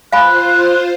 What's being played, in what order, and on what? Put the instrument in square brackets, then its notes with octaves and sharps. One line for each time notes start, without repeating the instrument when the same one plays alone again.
[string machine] F4 C5 [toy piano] F5 G#5 B5 [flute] F#6